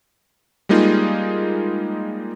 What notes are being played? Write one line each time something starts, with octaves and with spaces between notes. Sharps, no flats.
G3 G#3 A#3 D#4 F4 G#4